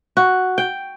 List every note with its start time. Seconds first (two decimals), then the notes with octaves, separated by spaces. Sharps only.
0.17 F#4
0.58 G5